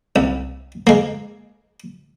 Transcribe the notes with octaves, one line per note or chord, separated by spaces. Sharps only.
C2
G#3 A#3